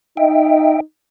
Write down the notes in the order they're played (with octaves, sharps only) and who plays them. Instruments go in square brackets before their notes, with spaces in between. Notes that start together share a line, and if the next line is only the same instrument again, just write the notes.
[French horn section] D#4 [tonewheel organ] D#5 E5 G5